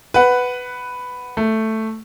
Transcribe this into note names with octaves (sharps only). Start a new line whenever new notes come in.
B4 F#5
A3